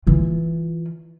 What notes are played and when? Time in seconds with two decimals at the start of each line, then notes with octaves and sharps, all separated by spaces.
0.07 E3 F4